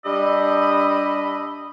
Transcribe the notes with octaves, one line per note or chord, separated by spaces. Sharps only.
G3 D4 G4 D#5 E5 B5